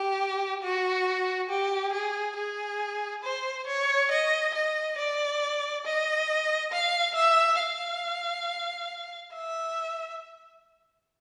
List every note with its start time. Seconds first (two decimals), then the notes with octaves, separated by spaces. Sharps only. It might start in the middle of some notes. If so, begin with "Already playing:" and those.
Already playing: G4
0.62 F#4
1.50 G4
1.93 G#4
2.36 G#4
3.23 C5
3.67 C#5
4.11 D#5
4.54 D#5
4.98 D5
5.85 D#5
6.72 F5
7.16 E5
7.59 F5
9.33 E5